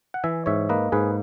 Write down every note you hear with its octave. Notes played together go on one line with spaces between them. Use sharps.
F#5
E3 E5 G#5
G#2 C#5 E5
A#3 B4 D#5
G#2 G#4 B4